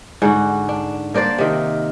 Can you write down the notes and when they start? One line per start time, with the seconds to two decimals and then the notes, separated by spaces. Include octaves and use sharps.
0.22 G#2 D3 F#4
0.69 D4
1.14 A#3 D4 C5 D5
1.38 C3 D#3